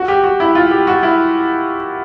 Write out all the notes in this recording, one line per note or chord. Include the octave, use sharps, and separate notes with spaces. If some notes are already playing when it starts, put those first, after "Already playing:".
Already playing: F#4
G4
F#4
E4
F4
G4
F#4
E4